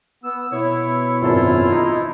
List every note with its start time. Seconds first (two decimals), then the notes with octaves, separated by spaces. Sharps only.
0.24 B3 E6
0.53 B2 E4 C#5
1.22 G#1 F#2 F4 A5
1.72 D#4